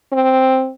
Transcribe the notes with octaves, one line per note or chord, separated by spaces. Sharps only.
C4